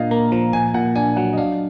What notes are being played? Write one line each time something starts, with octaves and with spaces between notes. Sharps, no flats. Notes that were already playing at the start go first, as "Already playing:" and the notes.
Already playing: A#2 D4 D#5 F5
A#3 A#5
F3 A#5
A#2 G#5
A#2 F#5
D4 G#5
F#3 F#5
D#5
D4 F5